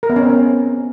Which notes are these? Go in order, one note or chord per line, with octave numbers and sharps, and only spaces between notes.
A#4
B3
C#4
C4
C#4